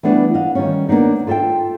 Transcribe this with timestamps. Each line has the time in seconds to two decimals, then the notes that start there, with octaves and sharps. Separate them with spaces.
0.03 E3 G3 A3 B3 D4
0.34 D#5 F5 F#5
0.55 D#3 G3 C#4
0.89 A#3 B3 D4 D#4
1.27 F4 A4 D#5 E5 G5